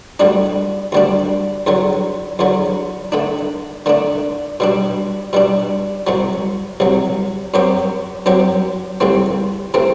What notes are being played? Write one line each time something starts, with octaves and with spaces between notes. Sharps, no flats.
D2 D3 G3 D4
D2 D3 G3 D4
E2 D3 F#3
E2 D3 F#3
D3 A3 D4
D3 A3 D4
B2 G3 D4
B2 G3 D4
C2 C3 F#3
C2 C3 F#3
F#2 F#3 C4 G4
F#2 F#3 C4 G4
C2 C3 E3 A3 C4
C3 E3 A3 C4